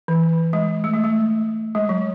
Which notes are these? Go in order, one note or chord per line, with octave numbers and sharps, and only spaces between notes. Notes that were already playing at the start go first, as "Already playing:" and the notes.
E3
G#3
A3
G#3
A3
G#3
F#3